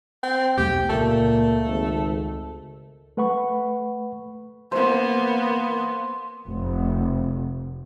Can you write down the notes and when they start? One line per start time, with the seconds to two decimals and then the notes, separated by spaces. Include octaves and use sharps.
0.23 C4
0.57 B1 E2 A3 G4
0.89 C#2 A#2 A3
1.66 G#1
3.17 A3 B4 F#5 B5 C#6
4.72 A#3 B3 C5
6.48 F1